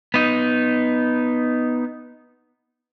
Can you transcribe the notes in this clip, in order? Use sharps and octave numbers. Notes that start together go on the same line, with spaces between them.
B3 D#4